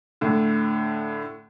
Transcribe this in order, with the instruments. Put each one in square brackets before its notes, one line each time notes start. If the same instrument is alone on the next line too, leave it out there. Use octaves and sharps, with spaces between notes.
[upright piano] A2 D3